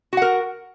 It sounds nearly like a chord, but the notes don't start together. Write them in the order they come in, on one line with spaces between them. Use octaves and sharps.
F#4 F#5 A#4